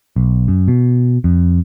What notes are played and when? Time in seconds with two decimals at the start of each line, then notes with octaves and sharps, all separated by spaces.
0.16 B1
0.48 F#2
0.68 B2
1.24 F2